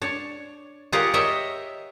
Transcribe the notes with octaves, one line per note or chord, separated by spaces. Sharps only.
D4 C#5
F4 G4 G#4 A#4 C#5 F#5
A#4 C#5 D#5 E5 G5